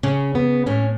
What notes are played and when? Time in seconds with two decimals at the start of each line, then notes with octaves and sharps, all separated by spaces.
0.03 C#3 C#4
0.35 B3
0.66 A2 C#4